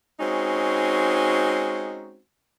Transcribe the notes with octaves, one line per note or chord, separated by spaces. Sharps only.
G#3 C4 C#4 D#4 F#4